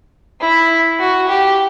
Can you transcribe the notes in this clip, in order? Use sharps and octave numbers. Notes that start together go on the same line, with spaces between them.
E4
F#4
G4